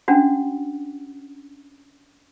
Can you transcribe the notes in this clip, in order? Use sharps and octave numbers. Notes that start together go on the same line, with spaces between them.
C#4 D4 F#4 F#5